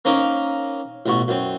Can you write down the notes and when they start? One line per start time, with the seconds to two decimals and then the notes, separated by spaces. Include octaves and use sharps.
0.05 A#3 C4 C#4 D#4 A#4
1.06 A1 B2 C#6
1.28 F#2 C4